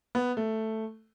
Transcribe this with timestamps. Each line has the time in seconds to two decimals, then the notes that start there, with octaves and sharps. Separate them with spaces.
0.15 B3
0.37 A3